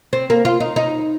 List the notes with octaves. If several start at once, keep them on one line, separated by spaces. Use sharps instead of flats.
C4
A#3
F4
D#4
D#4